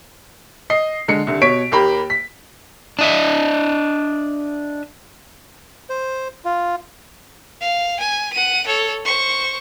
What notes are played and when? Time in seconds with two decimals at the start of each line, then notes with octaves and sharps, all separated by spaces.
0.70 D#5 C7
1.08 D3 G#3 C#7
1.27 C2 D3
1.41 B2 C#5 B6 D7
1.71 D#2 A#3 G4 B5
2.10 B6
2.99 D4 D#5 E5
5.90 C5
6.45 F4
7.61 F5
7.99 G#5
8.32 F#5 D#7
8.67 A4 C#5
9.05 C5 C#6